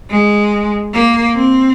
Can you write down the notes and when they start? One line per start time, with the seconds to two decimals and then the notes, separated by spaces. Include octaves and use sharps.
0.10 G#3
0.94 A#3
1.35 C4